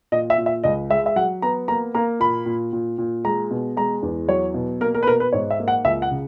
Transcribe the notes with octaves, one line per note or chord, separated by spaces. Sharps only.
A#2 D#5
E5
A#2
E5
C#2 D#5
G#3 E5
E5
F#3 F#5
B3 A#5
A#3 A#5
A#3 A#5
A#2 B5
A#2
A#2
A#2
G#3 A#5
B2
G#3 A#5
E2
F#3 C#5
B2
A#3 A#4
A#4
B4
B2 A#4
B4
G#2 C#5
E5
A#3
F#5
C#2 E5
F#5
C#3